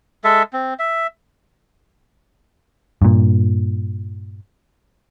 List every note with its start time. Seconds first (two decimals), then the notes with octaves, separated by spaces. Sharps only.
0.24 G#3 A4 E5
0.53 C4
0.79 E5
3.02 G2 A#2